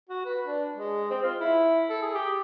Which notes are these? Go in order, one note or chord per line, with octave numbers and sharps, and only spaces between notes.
F#4
B4
D4
G#3
C4
F4
E4
A4
G#4
G4